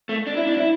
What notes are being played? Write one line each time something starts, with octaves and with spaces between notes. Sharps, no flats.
A3
D4
E4
D4
E4